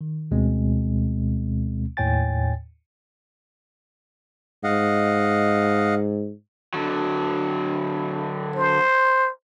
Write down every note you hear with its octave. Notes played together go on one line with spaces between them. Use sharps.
D#3
D2 B2 G#3 C4
D#2 A2 C#5 G5 G#5 A6
G#2 D#5 F5 F#5
D3 F#3
C5